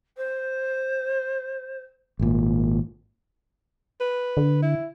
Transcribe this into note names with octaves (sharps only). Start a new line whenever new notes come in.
C5
G#1 A#2
B4
D3
E4